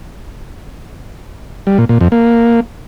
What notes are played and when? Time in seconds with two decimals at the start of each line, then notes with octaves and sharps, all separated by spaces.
1.67 G3
1.78 A#2
1.89 A#2
2.01 F2
2.12 A#3